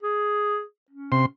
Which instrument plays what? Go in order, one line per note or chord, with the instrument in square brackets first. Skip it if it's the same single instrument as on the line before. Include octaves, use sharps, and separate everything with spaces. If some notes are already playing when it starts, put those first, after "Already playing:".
[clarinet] G#4
C#4
[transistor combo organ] C3 C6